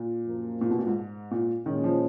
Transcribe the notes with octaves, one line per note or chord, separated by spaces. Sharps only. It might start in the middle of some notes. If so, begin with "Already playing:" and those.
Already playing: A#2
F#2 F3 A#3
A#2
B2
A#2
G#2
A#2
A#2 D#3 G#3 C#4
F3